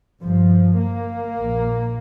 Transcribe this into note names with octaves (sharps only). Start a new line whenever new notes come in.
G1 G2 F3
A#3
A#1 A#2